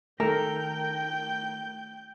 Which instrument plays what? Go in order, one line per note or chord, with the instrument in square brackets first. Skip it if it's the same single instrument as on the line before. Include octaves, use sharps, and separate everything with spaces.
[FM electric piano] D#3 A3 [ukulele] A4 [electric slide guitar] A#4 [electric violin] G5 G6